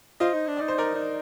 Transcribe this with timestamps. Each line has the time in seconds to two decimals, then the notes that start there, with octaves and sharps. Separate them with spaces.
0.20 F4 C5 D#5
0.34 D#4
0.48 D4
0.57 D#4 D5
0.68 C5
0.78 A#4 D5
0.95 D#4